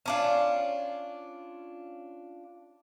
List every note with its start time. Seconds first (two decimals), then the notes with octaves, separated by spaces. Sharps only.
0.06 C#4 D4 F4